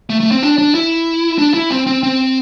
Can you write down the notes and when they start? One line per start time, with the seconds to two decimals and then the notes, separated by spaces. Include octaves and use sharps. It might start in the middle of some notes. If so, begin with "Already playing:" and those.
0.10 A3
0.20 A3
0.32 C4
0.43 D4
0.58 D4
0.75 E4
1.39 D4
1.54 E4
1.70 C4
1.87 C4
2.03 C4